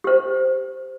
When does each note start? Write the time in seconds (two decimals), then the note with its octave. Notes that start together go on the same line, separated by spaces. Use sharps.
0.04 G4 C5